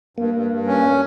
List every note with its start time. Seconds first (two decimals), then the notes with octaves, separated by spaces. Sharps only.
0.17 G2 A#3
0.34 G2
0.50 G2
0.67 C#4